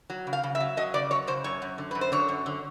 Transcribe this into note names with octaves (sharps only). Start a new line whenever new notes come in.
F#3
C#3
F5
C#3
E5
F#3
F#3 D#5
C#3 D5
F#3 C#5
C#3 C5
F#2 C#5
F#2
D3
F#2 B4
C5
D3 C#5
F#2
D3